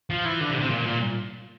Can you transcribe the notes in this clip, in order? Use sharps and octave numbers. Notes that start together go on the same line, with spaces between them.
F3
E3
D3
C3
C3
A#2
A#2